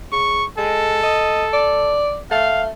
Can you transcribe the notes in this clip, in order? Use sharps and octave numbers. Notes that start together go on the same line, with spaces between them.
C#3 C#6
G#3 A4
D#5
D5
A3 F5